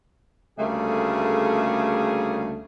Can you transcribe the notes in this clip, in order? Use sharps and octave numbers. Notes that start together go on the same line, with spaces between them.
D2 C#3 G3 A3 A#3 G#4